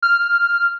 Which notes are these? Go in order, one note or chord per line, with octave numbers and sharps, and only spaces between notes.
F6